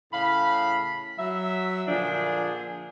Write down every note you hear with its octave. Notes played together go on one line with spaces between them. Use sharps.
A2 C#3 F5 B5
F#3 E5
A#2 D3 F3 D4 G#4